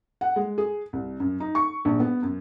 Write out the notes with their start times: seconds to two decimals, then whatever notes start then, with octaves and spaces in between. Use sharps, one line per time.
0.21 F#5
0.36 G#3
0.58 G#4
0.93 C2
1.20 F#2
1.40 D#4
1.55 C#6
1.85 A#1
2.00 B3
2.23 F#2